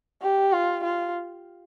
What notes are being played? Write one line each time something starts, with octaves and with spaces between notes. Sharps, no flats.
G4
F4
F4